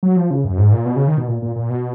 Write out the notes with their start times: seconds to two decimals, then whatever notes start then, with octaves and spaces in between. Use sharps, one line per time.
0.03 F#3
0.16 F3
0.31 C#3
0.44 F#2
0.58 G#2
0.72 A#2
0.86 B2
0.96 C#3
1.07 D#3
1.17 B2
1.28 A#2
1.42 A#2
1.56 A#2
1.70 B2